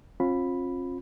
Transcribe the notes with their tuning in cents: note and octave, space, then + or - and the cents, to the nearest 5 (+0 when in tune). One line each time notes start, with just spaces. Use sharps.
C4 +45 F4 +25 B5 +0